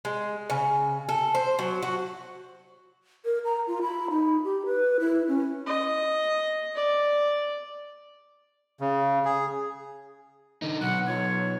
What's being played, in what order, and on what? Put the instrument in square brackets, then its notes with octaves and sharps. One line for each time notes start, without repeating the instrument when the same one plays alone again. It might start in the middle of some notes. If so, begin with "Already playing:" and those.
[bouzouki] G#3
C#3
A4
C5
F#3
F#4
[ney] A#4
A#5
F4
B5
D#4
G4
B4
E4
C#4
[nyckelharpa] D#5
D5
[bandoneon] C#3
G#4
[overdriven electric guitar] D3 D#4
[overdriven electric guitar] B1 [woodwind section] F#5
[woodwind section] F#3 F4 C#5